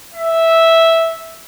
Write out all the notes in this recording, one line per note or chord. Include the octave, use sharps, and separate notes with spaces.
E5